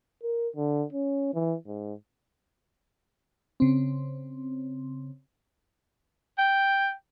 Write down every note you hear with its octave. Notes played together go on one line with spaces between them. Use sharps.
A#4
D3
C#4
E3
G#2
C#3 C4
G5